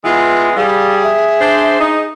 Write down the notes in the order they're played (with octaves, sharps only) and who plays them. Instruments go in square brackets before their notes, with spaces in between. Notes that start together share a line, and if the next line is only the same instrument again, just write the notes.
[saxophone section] E3 G#3 B3 [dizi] F4
[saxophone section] G3 [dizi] G#4 [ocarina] F5
[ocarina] E5
[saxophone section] D4 C5
D#4